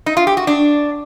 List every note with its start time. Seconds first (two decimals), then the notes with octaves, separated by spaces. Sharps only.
0.06 D#4
0.17 F4
0.27 G4
0.37 F#4
0.47 D4